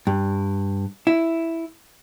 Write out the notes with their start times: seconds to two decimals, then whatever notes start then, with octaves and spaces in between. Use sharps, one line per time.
0.07 G2
1.07 E4